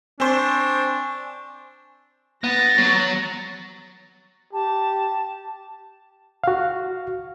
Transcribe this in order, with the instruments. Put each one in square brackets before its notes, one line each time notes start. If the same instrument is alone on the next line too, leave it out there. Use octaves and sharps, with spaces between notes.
[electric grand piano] C4 C5 [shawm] D4 [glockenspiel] G#5 C#6
[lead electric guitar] B3 [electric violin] A6 A#6
[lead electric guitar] F#3 C#5
[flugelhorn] G4 [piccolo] A5
[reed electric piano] F#4 F5